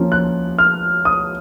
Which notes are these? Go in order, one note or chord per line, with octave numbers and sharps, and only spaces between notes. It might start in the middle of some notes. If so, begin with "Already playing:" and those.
Already playing: F3 A#3 C#4
F#6
F6
D#6